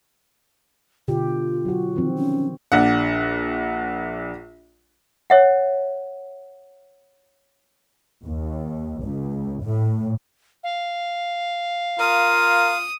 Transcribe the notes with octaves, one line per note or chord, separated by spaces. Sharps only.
B2 D3 F4 G4
F#3 F#4
D#3 F3 C4
C#4
A#1 D4 F#5
C#5 E5 F#5
D#2
C#2
A2
F5
F4 A#4 D#6